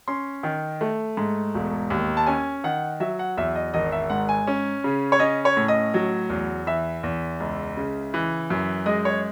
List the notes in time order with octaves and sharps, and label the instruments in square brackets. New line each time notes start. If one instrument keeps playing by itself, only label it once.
[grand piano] C#4 C6
D#3
A3
G#2
E1
D#2
A5
C#4 G#5
D#3 F#5
F#3 E5
F#5
E2 E5
D#5
G#1 D#5
E5
G#2 F#5
G#5
C#4
C#3
C#5
C#4 D#5
C#5
A2
D#5
F#3
E2
E3 E5
E2
C#2
C#3
E3
F#2
G#3 D#5
C#5